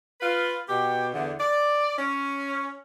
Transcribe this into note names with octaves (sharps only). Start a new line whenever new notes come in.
F4 B4
B2 G4
E2 D3
D5
C#4